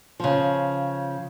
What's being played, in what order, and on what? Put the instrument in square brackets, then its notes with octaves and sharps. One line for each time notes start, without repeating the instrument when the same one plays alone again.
[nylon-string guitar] C#3 F3